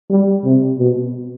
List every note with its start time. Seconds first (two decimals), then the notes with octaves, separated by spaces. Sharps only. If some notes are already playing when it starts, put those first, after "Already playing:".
0.10 G3
0.44 C3
0.79 B2